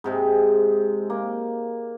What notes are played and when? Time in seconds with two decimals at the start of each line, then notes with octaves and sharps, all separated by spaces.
0.04 G#2 C3 G#3
1.10 A#3